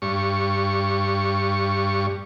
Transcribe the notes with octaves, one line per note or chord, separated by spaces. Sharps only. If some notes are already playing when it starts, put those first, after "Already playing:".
G2 C#6